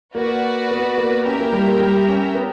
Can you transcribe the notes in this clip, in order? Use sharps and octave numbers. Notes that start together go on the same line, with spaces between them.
A#3 F#4 B4 D5
B3
A#3
C#4 G4 A#4 E5 G5
A#3
G3
A#3
G3
C#4
B3